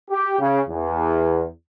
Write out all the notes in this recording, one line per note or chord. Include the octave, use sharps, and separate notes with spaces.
G4
C#3
E2